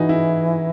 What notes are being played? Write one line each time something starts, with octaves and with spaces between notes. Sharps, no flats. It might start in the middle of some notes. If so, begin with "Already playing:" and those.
Already playing: E3 D#4 F#4 G#4
E4